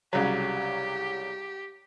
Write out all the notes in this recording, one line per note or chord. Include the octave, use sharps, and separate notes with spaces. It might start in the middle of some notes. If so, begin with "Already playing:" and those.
C2 C#3 F#3 G4